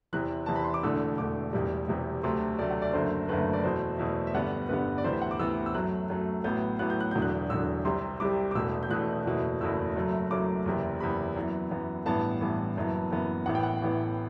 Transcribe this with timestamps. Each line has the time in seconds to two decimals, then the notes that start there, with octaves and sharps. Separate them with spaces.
0.13 E2 C3 E3 F#6
0.46 E2 C3 E3 A5
0.56 B5
0.64 C6
0.74 D6
0.83 E1 E2 D3 A3 E6
1.18 E1 E2 D3 A3 D6
1.53 E1 E2 C3 G3
1.88 E1 E2 C3 G3
2.23 D2 C3 F#3 A3 C6
2.59 D2 C3 F#3 A3 D5
2.70 F#5
2.82 D5
2.93 F#1 F#2 D3 A3 C5
3.29 F#1 F#2 D3 A3 B4
3.53 D5
3.64 E2 B2 A3 C5
3.98 E2 B2 A3 E5
4.27 E5
4.34 G1 G2 D3 G3 B3 F#5
4.69 G1 G2 D3 G3 B3 B4
4.98 D5
5.04 D2 C3 E3 B3 C5
5.13 E5
5.22 F#5
5.31 D6
5.39 D2 C3 E3 B3 E6
5.66 E6
5.74 F#2 F#3 A3 F#6
6.10 F#2 F#3 A3
6.44 A1 A2 F#3 B3 G6
6.79 A1 A2 F#3 B3 F#6
6.90 G6
7.00 F#6
7.11 E1 E2 D3 F#3 G6
7.22 F#6
7.49 E1 E2 D3 F#3 E6
7.85 C2 C3 G3 C6
8.20 C2 C3 G3 D6
8.51 D6
8.55 E1 E2 B2 A3 E6
8.83 G6
8.90 E1 E2 B2 A3 F#6
9.25 F#1 E2 B2 A3
9.60 F#1 E2 B2 A3 E6
9.96 F#1 F#2 F#3 A3
10.30 F#1 F#2 F#3 A3 D6
10.65 F#1 E2 C3
11.00 F#1 E2 C3 B5
11.36 F#2 E3 B3
11.71 F#2 E3 B3
12.06 A1 G2 E3 B3 A5
12.41 A1 G2 E3 B3
12.76 F#1 F#2 E3 B3
13.11 F#1 F#2 E3 B3
13.46 A1 A2 E3 B3 F#5
13.55 G5
13.63 F#5
13.82 A1 A2 E3 B3